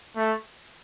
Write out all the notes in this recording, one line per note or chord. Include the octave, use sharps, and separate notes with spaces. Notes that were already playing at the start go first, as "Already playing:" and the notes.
A3